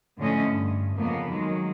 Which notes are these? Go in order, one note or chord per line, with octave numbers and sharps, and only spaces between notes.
F2 A2 D3 A3 C#4 D#5
G2
F2 C#3 A#3 B3
D#3 F#3 G#3